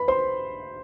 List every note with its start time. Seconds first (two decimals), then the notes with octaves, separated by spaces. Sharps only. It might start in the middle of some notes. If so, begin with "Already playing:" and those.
Already playing: B4 B5
0.08 C5 C6